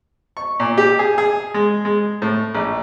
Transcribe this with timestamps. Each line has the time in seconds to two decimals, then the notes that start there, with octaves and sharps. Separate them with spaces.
0.37 C#6
0.60 A#2
0.78 G4
0.99 G#4
1.18 G#4
1.54 G#3
1.85 G#3
2.22 A2
2.55 A#1